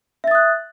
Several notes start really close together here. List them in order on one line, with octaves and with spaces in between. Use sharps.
E5 A6 D#6 F#6